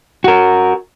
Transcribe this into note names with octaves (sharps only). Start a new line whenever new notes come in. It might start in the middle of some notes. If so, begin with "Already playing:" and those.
F#4 A#4